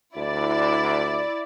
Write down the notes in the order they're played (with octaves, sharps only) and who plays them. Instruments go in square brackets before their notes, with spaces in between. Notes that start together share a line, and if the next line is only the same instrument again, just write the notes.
[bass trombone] D2 [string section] E4 D5